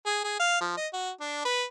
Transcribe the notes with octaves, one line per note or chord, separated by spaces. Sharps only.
G#4
G#4
F5
F3
D#5
F#4
D4
B4